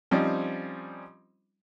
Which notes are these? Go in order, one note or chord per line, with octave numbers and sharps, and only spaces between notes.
F3 G3 C4 C#4 D#4